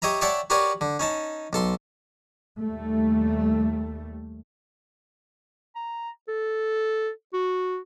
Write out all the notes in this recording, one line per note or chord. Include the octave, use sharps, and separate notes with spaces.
G4 C#5 D#5 E5 A#5
C#5 D5 E5 F#5 G5 A5
F#4 G4 A#4 B4 C#5 D5
D3
C#4 D#4 A5
B1 A4 C6
D#2 G3 A3
A#5
A4
F#4